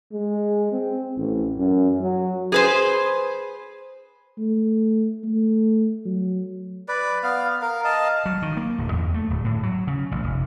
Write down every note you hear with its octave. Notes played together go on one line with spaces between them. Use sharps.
G#3
C4
A1
F#2
F#3
G#4 B4 C5
A3
A3
F#3
B4 D5
B3 F5
A#4 F5
D#5 F5 A5
F#3
D#3
A#3
D1
E2
A3
D1
A2
F#3
C#3
A1
F1